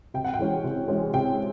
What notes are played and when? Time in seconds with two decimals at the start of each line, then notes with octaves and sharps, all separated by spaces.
0.14 C3 G5
0.25 F#5
0.34 G5
0.39 E3 G#3 C#4
0.64 C3
0.88 E3 G#3 C#4
1.14 C3 G5